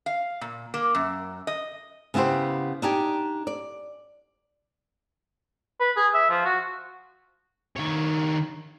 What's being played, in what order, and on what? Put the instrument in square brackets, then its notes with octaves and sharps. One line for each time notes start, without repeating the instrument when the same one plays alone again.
[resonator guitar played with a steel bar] F5
A#2
A#3
F#2
D#5
[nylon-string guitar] C#3 B3 E4 G4 C5
D4 D#4 G4 G#5
D5
[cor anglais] B4
G#4
E5
F3
F#4
[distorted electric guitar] D#3 C#5